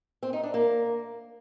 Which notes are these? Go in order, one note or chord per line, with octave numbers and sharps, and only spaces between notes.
C4
D#4
D4
A#3